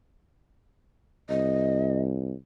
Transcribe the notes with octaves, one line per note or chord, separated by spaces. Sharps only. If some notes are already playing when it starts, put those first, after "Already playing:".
C2 D#5